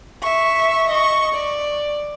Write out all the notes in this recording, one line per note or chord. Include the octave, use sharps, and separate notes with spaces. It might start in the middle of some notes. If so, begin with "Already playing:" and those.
E5 C#6
D#5 C#6
D5